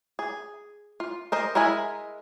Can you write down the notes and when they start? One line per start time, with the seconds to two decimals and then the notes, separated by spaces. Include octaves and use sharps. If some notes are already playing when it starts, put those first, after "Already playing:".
0.19 G#4
1.00 F4
1.32 A#4 C5 D#5
1.55 G#3 E4 A#4 G#5 B5